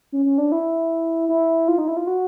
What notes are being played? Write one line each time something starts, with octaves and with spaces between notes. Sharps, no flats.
C#4
C#4
D4
E4
E4
F4
D#4
E4
F4
F#4